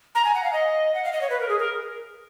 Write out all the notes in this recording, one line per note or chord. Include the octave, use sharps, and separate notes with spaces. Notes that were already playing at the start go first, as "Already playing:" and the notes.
A#5
G#5
F#5
F5
D#5
F#5
F5
D#5
C#5
B4
A#4
G#4
A#4